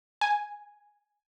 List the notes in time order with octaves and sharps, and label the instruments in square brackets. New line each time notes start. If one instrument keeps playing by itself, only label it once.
[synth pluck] G#5